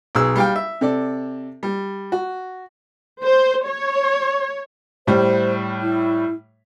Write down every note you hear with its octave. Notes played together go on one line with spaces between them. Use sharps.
B1 G#4 E6
G3 F5 G5
E5
C3 A4 D5
G3
F#4
C5
C#5
A2 G3 C5
E4